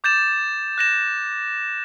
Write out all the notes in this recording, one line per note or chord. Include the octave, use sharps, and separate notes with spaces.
D6 G6 A6 E7
F#6 A#6 E7